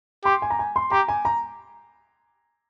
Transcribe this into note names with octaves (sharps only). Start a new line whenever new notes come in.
G4 C6
G#5
A#5
G#5
C6
G4 A#5
G#5
A#5